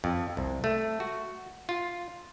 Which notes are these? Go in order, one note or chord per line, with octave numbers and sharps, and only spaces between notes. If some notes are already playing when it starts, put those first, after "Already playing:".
F2
C2
A3
F#4
F4